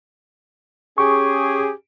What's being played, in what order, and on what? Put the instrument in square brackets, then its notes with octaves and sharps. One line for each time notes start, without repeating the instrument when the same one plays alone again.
[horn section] C#4 G4 G#4 [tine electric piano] C#6